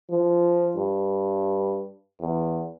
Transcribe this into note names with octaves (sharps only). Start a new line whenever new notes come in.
F3
G2
E2